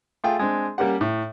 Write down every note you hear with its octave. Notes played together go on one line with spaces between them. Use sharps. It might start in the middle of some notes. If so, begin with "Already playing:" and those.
A3 F4 G#4 G5
G#3 C4 D4
G3 A#3 C#4 G4 F#5
A2